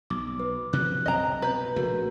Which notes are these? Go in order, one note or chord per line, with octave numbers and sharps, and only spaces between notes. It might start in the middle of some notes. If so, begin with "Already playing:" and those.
B1 D6
B4
C3 F3 F#3 F#6
C2 F#2 C4 D#5 A#5
B2 B4 A#5 G6
A#1 C#3 A3 F#4 A#4